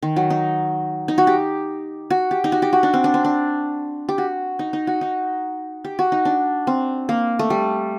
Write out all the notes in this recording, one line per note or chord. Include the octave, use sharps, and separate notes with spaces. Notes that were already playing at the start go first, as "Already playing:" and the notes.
D#3
F#3
D#4
D#4
F#4
G4
F#4
G4
D#4
F#4
G4
F#4
D4
C4
D4
C4
D4
G4
F#4
D#4
D#4
F#4
D#4
G4
F#4
D#4
D4
C4
A#3
A3
G3